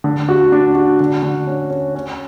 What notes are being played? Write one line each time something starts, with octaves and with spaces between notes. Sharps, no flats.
D3
F#4
D4
F#4
D3
D3
C#4
C#4
C#4